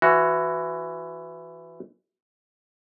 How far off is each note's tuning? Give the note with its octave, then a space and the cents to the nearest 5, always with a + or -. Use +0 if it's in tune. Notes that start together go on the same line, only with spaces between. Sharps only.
E3 +15 F#4 +0